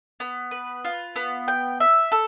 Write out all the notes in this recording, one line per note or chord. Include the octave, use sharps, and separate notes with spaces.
B3
B4
F4
B3
G5
E5
A4